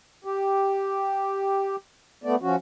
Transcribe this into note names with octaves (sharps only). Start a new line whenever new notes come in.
G4
A3 B3 D5
F3 C#4 F#4